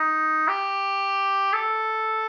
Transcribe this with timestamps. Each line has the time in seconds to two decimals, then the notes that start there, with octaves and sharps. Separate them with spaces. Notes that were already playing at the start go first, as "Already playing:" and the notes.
Already playing: D#4
0.48 G4
1.53 A4